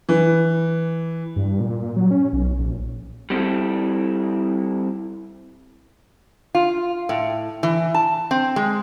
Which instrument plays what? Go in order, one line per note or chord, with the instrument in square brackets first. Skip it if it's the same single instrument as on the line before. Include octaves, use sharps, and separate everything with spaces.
[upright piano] E3
[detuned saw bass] G2
A#2
F#3
C#4
B1
A#1
[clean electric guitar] G3 C4 E4 A4
[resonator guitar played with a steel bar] F4
A2
E3
A5
C4
G#3